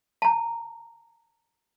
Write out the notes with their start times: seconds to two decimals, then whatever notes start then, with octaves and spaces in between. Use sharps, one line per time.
0.22 A5 A#5